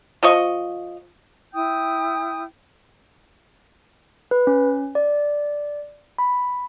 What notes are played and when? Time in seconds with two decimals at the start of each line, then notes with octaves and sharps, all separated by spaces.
0.23 F3 D#5 C#6
1.53 E4 G5 D#6 G6
4.31 B4
4.47 C#4
4.95 D5
6.18 B5